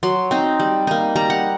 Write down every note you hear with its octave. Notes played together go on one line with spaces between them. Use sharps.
F#3 C6
C4 D#4
G3
A#3 D#4
G3 A#5
F#5